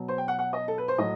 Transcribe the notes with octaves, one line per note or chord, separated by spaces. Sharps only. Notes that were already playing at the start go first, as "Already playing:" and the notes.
Already playing: B2 F#3
C5
G5
F#5
F#5
D#5
A4
B4
C5
A2 F#3 D#5